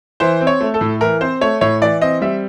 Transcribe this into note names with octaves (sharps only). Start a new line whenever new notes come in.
E3 C5
C4
C#5
A3
A4
A2
E3 A#4
C4 C5
A3 C#5
A2 C#5
E3 D5
C4 D#5
G3 E5